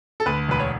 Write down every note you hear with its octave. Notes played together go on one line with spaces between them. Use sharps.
A4
D2 B4
E1 B4
C#5